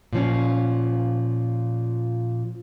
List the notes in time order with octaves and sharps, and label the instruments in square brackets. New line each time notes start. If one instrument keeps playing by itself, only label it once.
[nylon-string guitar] A#2 F3 C#4